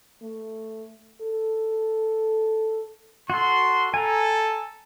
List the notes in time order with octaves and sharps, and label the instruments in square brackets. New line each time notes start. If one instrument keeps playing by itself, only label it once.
[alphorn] A3
A4
[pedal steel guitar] F#4 A4 [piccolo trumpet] C6
[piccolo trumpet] A4 [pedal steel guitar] G#5 A#5